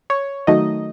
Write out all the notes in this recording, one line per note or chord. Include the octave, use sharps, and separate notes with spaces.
C#5
D#3 F#3 A3 D#4 D#5